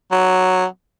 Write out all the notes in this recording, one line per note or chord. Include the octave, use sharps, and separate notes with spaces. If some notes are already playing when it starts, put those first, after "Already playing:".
F#3